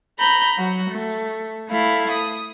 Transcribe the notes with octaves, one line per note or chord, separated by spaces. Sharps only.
A#5 B5 G6
F#3 F#4
A3
A3 E4 F5
D#6